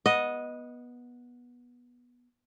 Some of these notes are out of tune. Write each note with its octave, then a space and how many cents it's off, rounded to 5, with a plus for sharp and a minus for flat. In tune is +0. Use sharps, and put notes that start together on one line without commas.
B3 -15 D#5 +0